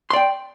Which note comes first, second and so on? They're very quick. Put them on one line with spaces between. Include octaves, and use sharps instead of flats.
C6 D5 G5